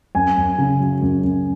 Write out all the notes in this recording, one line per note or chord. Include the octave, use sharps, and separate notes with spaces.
F#2 G#5
F#2
C#3
F#3
F#2
F#2